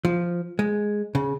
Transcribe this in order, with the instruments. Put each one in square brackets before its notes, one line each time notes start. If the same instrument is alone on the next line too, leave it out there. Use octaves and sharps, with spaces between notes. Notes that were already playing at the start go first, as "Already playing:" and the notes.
[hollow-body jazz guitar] F3
G#3
C#3